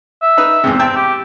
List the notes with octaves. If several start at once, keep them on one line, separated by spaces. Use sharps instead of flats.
E5
D#4 B4
E2 G#2 C3
C4 E5 G5 A5
G4